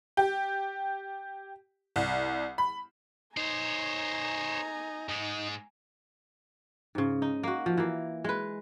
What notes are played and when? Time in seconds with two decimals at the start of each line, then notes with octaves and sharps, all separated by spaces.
0.17 G4
1.96 C2
2.58 B5
3.37 D#4 C5 C#5 G#5 A#5
5.09 G#2 G#3 D#4
6.95 G#2 C#3
7.22 D#4
7.43 A#3 F#4
7.66 F3
7.77 E3 A#3
8.24 G#3 B4